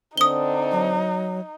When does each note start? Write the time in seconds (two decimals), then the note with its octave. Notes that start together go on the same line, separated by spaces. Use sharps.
0.17 D3 C4 D4 D#4 D#6 G7
0.72 F#3